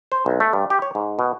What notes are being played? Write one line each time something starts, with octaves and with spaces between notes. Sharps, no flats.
C5
B1
A3
G2
G4
C#5
G#2
B2